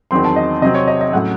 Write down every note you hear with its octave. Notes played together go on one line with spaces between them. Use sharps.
E2 D#3 F#3 C4 C6
A5
D#5
C3 F#3 C4 D#5
C#5
D#5
D#5
A2 F#3 C#4 F#5